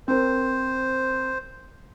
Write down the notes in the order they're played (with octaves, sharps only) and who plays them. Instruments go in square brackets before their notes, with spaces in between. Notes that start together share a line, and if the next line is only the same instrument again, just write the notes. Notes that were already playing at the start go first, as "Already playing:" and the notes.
[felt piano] C4 A#4 [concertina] C5